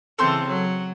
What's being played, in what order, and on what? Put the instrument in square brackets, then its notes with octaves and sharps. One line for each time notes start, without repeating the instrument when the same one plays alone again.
[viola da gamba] C#3 E3 C4 [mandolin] A4 C6 G6
[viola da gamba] F#3